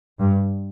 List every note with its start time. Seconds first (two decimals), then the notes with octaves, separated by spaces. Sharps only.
0.19 G2